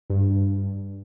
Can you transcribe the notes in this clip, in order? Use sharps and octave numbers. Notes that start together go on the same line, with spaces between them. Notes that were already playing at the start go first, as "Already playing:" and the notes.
G2